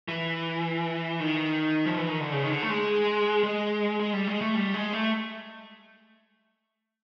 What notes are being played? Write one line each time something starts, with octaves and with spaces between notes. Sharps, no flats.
E3
D#3
F3
E3
D#3
D3
C#3
D#3
D3
A3
G#3
G#3
G#3
G3
G#3
A3
G3
G#3
A3